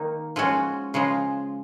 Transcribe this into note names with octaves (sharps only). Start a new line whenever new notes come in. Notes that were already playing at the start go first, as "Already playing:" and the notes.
Already playing: D#3 A#3 D#4
F3 G#3 C#4 F#4
C#3 F3 G#3